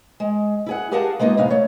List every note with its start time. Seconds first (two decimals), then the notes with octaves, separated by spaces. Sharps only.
0.20 G#3
0.66 E4 G#4 F#5
0.91 G4 G#4 A#4 F5 F#5 A5
1.19 G#3 A#3 B3 D4 D#4 F4
1.37 E2 A2 C3 D#4 F5
1.50 A3 C#5